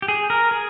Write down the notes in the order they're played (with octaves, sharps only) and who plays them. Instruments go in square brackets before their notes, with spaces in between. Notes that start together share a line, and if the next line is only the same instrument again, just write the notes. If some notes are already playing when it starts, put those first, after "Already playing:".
[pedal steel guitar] G4
G#4
A#4
G#4